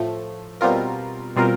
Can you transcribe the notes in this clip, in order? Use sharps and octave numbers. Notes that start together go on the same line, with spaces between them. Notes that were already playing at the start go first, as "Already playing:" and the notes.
Already playing: A2 F3 A3
B2 G3 C4 F4 A#4
B2 G3 C4 F4 A#4